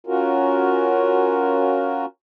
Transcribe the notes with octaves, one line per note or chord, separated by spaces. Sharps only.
C#4 F4 F#4 A#4